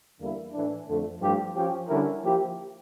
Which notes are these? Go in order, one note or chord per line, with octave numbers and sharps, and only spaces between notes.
E2 D3 G3 A#3 E4
A2 E3 A3 D4
F2 D3 A3
G2 F3 A3 E4 G4
F3 C#4 G4
D3 G3 C#4 E4 A#4
F3 A#3 E4 G4